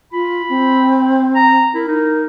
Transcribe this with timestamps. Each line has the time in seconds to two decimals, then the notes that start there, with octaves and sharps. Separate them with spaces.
0.13 F4 B5
0.49 C4
1.35 A#5
1.75 E4 A#4
1.88 D#4